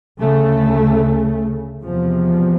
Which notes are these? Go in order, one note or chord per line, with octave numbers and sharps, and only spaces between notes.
D2 C#3 A3
E2 C3 F3